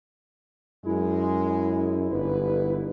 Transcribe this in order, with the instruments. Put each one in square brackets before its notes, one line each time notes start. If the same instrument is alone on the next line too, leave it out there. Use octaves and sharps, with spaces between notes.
[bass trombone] F#2 [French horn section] G#3 [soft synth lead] E4
[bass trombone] G1 [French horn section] G#2 B4